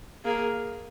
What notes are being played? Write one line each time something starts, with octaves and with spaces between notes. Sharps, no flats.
A#3 G#4